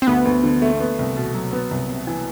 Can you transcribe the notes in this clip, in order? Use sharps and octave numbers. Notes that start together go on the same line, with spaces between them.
C4
D2 B3
D2
D3
A3
B3
C2
B2
F#3
B3
C2
C3
E3